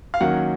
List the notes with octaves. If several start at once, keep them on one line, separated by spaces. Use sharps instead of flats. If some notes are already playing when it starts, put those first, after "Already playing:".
F5
D#3 F#3 A#3 C#4 F#5